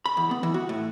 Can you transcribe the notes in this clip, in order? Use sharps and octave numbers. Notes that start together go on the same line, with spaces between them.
B5
E2
B3
E3
F#4
A2